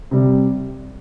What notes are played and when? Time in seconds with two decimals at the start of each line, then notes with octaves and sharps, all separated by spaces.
0.11 C3 G3